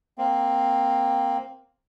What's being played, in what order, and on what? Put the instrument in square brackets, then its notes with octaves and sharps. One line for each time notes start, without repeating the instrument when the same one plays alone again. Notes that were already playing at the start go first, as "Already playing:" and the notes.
[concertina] A#3 C4